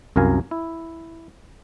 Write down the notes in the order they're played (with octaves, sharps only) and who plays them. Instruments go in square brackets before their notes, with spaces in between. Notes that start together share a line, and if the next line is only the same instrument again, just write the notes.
[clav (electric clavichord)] C2 F#2 A#4 F5 G#5
E4